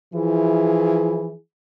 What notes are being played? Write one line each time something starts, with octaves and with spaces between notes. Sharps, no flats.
E3 F3 E4 G#4